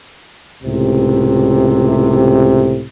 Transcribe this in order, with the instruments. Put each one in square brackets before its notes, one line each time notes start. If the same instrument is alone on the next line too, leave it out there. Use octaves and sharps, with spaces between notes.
[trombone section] C#2 A2 C3